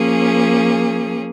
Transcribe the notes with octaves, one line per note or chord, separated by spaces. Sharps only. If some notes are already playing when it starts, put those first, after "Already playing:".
Already playing: F3 A#3 C#4 G#4